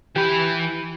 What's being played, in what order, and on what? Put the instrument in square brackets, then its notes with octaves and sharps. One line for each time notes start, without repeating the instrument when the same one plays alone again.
[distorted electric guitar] E3 B5 [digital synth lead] G4